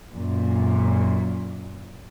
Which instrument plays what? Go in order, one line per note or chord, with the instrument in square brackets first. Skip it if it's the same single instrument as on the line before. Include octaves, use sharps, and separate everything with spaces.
[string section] F#2 A#2